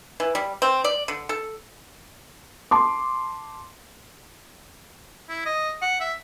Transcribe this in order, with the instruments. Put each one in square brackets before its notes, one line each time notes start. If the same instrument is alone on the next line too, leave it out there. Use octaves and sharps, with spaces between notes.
[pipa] E3
G3
C4
D5
D3
A4
[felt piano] A5 C6 D6
[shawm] E4
D#5
F#5
E5